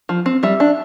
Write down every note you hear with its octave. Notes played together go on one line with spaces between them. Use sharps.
F3
C4
G3 E5
D4